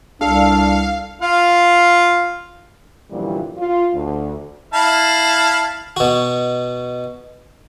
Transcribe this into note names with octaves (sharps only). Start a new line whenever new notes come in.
C2 D4 A4 F5
F4 F5
F#2 A#2 D3 E3 F3 G3
F4
D2
E4 F5 A5
B2 F#4